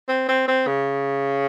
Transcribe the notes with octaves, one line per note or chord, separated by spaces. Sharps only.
C4
C4
C4
C#3